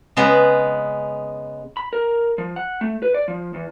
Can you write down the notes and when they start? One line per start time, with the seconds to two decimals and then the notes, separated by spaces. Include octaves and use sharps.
0.17 C#3 G#3 B3 B4
1.77 B5
1.93 A#4
2.38 F3
2.56 F#5
2.81 A3
3.02 B4
3.14 D5
3.28 F3
3.54 E2